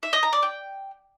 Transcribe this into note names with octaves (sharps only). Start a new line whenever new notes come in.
E5
D#5
A#5
D5
G5